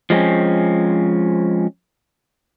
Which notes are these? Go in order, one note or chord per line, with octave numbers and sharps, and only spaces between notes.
F3 G#3 A3 C4 C#4